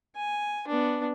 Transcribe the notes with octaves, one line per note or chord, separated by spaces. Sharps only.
G#5
B3 D4